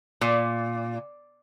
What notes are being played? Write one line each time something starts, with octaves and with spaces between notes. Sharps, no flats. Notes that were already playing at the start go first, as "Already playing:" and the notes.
A#2